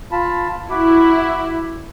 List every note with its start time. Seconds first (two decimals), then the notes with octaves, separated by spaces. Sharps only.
0.12 F4 A5 B5
0.71 E4 F#4 B5 D6